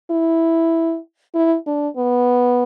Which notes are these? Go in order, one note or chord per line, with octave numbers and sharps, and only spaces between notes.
E4
E4
D4
B3